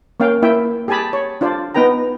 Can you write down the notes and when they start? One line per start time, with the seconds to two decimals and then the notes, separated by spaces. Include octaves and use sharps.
0.20 A#3 C#4 F5 G5
0.42 A#3 E4 E5 G5
0.88 G4 G#4 G#5 A5 B5
1.13 C#5
1.41 D4 F4 C5 D5
1.74 B3 D#4 B4 G5 A#5